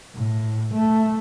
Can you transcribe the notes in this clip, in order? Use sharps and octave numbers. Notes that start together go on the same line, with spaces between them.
A2
A3